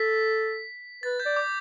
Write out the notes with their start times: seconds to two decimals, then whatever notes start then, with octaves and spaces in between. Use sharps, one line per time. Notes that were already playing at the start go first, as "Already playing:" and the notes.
Already playing: A4 B6
1.03 B4 A6
1.20 G6
1.26 D5
1.36 D6